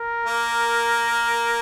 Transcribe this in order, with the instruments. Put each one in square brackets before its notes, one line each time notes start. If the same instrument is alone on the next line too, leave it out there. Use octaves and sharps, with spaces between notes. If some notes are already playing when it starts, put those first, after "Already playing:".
Already playing: [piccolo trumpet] A#4
[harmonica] A#3